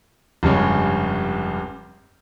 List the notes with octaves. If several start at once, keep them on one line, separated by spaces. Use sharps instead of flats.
F1 G2 C#3 G#3 C#5